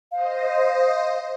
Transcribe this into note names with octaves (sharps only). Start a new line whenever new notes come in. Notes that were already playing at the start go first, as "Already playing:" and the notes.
C5 D#5 F5